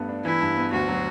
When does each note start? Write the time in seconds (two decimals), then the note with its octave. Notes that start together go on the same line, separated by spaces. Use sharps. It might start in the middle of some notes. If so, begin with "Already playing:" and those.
Already playing: G2 A3 B3
0.09 D4
0.25 E3 E4
0.41 G2
0.57 B3
0.73 D2 F#4
0.88 F#3